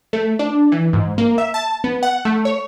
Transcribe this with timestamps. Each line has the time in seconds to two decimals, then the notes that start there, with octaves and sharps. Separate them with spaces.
0.13 A3
0.39 D4
0.72 E3
0.93 G#2
1.18 A#3
1.38 E5
1.54 A5
1.84 B3
2.03 F#5
2.25 A3
2.45 C#5